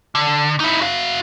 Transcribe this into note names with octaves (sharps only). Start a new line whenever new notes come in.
D3
D#4 E4
F#4 F5